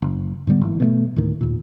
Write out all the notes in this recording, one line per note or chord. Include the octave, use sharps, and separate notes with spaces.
F#1
G#2 D3 G3 B3
G#1 E3
B2 G3 A3
D2 A2 D#3
D#2 A#2